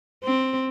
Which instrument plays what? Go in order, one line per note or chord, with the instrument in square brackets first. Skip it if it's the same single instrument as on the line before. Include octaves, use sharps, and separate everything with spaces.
[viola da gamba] C4